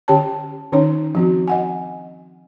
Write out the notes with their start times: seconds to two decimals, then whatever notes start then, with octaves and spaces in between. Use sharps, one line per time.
0.08 D3 C#4 G4 C#5 G5 A5
0.72 D#3 C#4 D#4 C#5
1.15 F3 C4 F#4
1.48 D#5 F#5 G#5